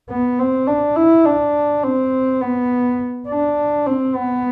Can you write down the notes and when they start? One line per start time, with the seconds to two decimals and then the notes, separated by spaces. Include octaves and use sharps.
0.10 B3
0.39 C4
0.67 D4
0.96 E4
1.25 D4
1.84 C4
2.42 B3
3.28 D4
3.86 C4
4.15 B3